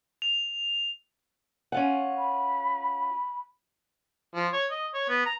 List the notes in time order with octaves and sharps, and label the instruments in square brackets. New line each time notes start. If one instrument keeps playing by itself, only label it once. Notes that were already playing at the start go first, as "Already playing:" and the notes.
[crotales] F7
[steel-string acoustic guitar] C#4 F4 F#5
[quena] B5
[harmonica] F3
C#5
D#5
C#5
B3
A#5